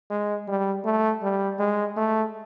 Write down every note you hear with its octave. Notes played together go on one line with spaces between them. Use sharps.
G#3
G3
A3
G3
G#3
A3